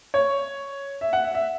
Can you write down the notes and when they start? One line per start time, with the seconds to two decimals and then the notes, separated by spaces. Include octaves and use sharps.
0.14 C#5
1.01 E5
1.13 F#5
1.24 E5
1.34 E5